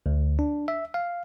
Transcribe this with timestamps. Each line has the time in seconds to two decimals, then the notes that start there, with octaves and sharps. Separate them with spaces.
0.06 D2
0.39 D4
0.68 E5
0.94 F5